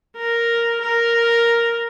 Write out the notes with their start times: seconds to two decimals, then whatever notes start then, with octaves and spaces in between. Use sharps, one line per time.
0.17 A#4
0.81 A#4